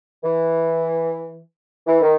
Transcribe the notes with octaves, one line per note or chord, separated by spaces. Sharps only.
E3
E3
D#3